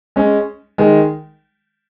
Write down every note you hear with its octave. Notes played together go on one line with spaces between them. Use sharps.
G#3 C#4
D#3 G#3